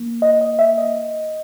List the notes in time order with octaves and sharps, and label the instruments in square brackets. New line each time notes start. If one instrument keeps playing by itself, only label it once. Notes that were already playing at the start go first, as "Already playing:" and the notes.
Already playing: [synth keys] A#3
D#5
D#5
E5
D#5